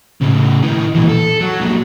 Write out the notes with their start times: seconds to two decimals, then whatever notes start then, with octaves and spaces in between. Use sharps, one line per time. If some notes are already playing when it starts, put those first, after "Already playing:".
0.21 A2 C#3
0.62 D#3 E3
0.95 A#2 E3
1.09 A4
1.40 F#3
1.60 A#2 F#3